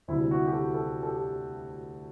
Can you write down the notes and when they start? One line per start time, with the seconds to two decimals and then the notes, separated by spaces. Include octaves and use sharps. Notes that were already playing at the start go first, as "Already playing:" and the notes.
0.08 D2 C3 G3 E4
0.31 F#4
0.47 G4
0.52 A4
0.74 A4
1.03 A4
1.08 G4